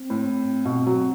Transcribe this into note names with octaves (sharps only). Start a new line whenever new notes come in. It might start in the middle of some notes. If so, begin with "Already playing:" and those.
Already playing: C4
A2
B2
F#3